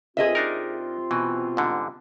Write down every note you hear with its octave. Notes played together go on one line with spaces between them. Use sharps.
G1 C3 C4 F4 G#4 D#5 E5
D4 D#4 A#4
B2 E3
G#2 D3 G3